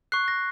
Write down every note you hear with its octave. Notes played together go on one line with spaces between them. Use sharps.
C#6 F#6 C7
A#6